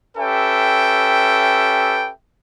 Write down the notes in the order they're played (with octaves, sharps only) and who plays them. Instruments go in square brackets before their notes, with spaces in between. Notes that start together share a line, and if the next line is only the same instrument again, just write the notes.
[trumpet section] C#4 G4 A4 B4 E5 G5